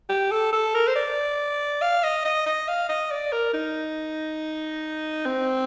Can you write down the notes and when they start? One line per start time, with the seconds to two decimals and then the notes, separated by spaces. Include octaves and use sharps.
0.09 G4
0.31 A4
0.53 A4
0.74 A#4
0.87 C5
0.96 D5
1.82 F5
2.03 D#5
2.25 D#5
2.46 D#5
2.68 F5
2.89 D#5
3.11 D5
3.32 A#4
3.54 D#4
5.26 C4